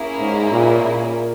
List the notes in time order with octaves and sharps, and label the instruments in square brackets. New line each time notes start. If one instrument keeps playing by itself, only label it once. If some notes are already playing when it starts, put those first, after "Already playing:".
Already playing: [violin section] A#3 C#4 E4 G#4
[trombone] G#2
A#2
A#2